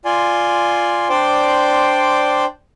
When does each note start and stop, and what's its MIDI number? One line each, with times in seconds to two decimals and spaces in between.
0.05 1.08 65
0.05 1.08 74
0.05 1.08 80
0.05 1.08 84
1.10 2.45 62
1.10 2.45 72
1.10 2.45 74
1.10 2.45 79
1.10 2.45 84
1.10 2.45 86